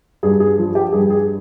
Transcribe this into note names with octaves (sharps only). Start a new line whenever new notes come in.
G2 G#4
G#4
F3
G4
G2 G#4
G#4